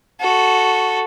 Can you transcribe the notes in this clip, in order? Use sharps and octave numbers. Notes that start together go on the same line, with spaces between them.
F#4 A4